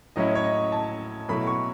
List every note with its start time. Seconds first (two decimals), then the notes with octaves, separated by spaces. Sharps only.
0.16 A2 F#3 C#4 E4 D#5
0.35 C#5
0.44 D#5
0.72 A5
1.29 B2 F#3 A3 E4 B5
1.47 C#6